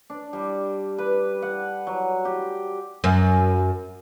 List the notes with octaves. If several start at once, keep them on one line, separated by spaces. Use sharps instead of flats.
D4
G3
B4
F#5
F#3
G4
F#2